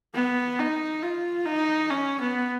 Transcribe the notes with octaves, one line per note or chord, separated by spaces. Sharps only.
B3
D#4
F4
D#4
C#4
B3